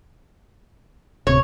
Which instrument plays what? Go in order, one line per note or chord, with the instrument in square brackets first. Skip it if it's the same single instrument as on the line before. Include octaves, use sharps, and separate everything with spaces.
[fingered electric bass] D1 C3 [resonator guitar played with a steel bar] C#5